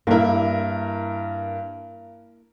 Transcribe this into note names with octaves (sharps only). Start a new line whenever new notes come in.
G2 A#3 E4 A#4